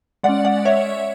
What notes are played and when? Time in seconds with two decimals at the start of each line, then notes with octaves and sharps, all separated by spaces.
0.23 G#3 C#4 D5 F#5
0.45 D5 F#5
0.65 C#5 E5